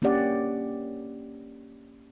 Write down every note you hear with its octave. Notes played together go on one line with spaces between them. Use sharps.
A#3 C#4 D4 G4 D5 F#5